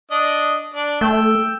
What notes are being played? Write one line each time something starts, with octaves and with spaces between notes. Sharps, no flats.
D4 D#5
D4
A3 G5 E6